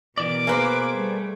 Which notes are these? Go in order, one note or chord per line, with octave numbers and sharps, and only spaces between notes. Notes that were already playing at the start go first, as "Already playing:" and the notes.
B2 E3 A#4 D5 D6
A#3 G#4 B4 C5
G3 A3